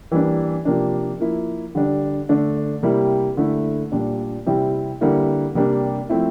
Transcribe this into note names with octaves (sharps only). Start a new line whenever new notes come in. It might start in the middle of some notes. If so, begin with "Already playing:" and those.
E3 G3 A#3 D4
C3 F3 A#3 D4
F3 A#3 E4
D3 G3 D4
D3 A3 D4
C3 G3 A#3 E4
D3 A3 E4
A#2 G3 D4
C3 G3 C4 E4
D3 G3 A#3 E4
C3 G3 A#3 D4
F3 A3 C4 E4